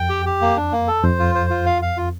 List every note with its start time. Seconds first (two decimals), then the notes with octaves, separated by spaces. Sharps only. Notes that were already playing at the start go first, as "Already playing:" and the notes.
Already playing: F2 G5
0.09 G4
0.26 G4
0.41 A#3
0.57 D4
0.72 A#3
0.88 A4
1.03 F2 C5
1.19 F4
1.35 C5
1.50 F4
1.66 F5
1.82 F5
1.97 F4